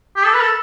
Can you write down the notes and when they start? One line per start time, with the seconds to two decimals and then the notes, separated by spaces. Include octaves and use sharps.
0.16 G4
0.25 A4
0.34 B4
0.42 A4